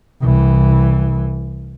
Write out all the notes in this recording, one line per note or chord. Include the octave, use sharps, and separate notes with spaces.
C2 E3